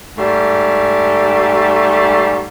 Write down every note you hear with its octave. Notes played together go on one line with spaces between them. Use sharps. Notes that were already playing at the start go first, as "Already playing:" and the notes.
G#2 G3 A3